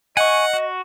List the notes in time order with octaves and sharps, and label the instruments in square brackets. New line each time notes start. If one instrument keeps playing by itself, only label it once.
[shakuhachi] D#5 [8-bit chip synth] F#5 [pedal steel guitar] G#5 C#6
[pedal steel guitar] F#4